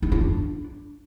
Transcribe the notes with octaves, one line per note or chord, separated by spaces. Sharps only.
D#4
F4
D4